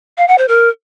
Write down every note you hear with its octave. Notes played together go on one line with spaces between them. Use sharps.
F5
F#5
C5
A#4